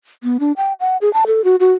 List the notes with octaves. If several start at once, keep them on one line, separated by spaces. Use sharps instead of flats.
B3
D4
G5
F#5
G#4
A5
A4
F#4
F#4